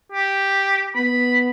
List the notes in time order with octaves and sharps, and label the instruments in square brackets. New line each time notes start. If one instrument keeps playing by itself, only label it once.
[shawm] G4
[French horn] B3 [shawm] B5